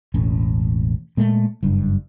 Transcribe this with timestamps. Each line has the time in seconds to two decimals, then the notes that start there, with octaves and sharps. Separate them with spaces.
0.14 E1 A1 C#4
1.17 A#2 G#3 A3
1.63 F#1 G2